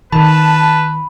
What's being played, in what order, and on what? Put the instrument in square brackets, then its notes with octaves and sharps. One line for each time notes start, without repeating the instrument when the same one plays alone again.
[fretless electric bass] D#3 [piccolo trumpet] B4 [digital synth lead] A5 [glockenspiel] B5